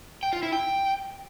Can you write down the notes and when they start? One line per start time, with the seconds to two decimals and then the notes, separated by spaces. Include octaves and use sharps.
0.23 G5
0.33 F4
0.43 E4
0.53 G5